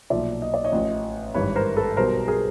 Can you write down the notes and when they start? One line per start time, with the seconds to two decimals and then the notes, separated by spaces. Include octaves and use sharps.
0.10 B1 A#2 F3 D5 E5
0.42 D#5
0.54 D5
0.64 C#5 D#5
0.72 A1 A2 F3
1.34 G#1 G2 E3 G3 B4 C#5
1.56 A#4 C5
1.76 A4 B4
1.97 B1 B2 G3 A#4 C5
2.28 G#4 A#4